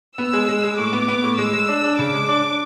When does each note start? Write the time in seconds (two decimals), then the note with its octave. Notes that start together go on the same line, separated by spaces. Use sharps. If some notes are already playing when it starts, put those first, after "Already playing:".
0.18 B3 E6
0.33 G#3
0.49 G#3
0.64 G#3
0.78 A2 D6
0.93 B3
1.08 B3
1.23 A2
1.38 G#3 E6
1.53 G#3
1.68 D4
1.84 D4
1.98 C#3 D6
2.14 G#3
2.29 D4
2.43 D4